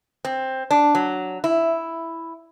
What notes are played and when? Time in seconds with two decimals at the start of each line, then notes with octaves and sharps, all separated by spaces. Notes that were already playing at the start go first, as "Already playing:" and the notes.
0.25 C4
0.71 D4
0.95 F#3
1.44 E4